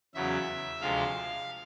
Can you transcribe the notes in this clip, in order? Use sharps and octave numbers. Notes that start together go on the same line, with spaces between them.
E2 C#3 F#3 E5
D2 C3 F3 G#3 F5